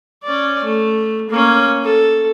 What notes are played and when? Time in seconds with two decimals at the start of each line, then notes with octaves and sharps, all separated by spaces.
0.23 C#4 D5
0.64 A3
1.30 A#3 C#4
1.84 A4